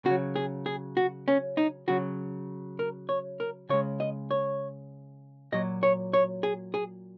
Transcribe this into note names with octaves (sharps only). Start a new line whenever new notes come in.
C#3 F#4
F#3
G#4
G#4
F#4
C#4
D#4
C#3 F#3 F#4
A#4
C#5
A#4
C#3 G#3 C#5
D#5
C#5
A#2 F#3 D#5
C#5
C#5
G#4
G#4